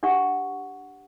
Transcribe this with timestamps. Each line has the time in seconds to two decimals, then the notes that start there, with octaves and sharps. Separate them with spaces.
0.03 D4 G4 B4 E5 F#5 C#6